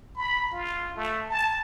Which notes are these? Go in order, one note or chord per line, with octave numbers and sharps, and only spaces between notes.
B5
F4
A3
A5